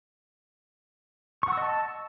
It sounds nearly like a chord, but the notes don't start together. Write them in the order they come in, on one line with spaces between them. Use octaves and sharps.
C#6 F#5 E6 D#5 A5